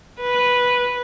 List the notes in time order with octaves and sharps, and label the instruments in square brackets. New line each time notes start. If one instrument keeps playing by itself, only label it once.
[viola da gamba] B4